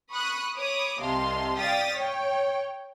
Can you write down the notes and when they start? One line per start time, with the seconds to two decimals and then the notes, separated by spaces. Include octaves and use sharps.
0.12 B5 C#6 D#6 F#6
0.58 C#5 B5 D6 D#6
1.01 C2 C3 D#5 F5 A5 C6
1.58 D5 F5 G5 D#6 A6 B6
1.96 C#5 G5